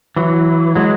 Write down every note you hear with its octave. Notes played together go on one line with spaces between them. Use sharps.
E3 F#3
F#3 G#3